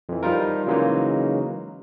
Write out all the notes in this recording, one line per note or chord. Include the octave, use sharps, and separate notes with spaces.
F2 E3
F3 G3 D#4 F4 A#4
C#3 E3 F#3 G#3 A#3 D#4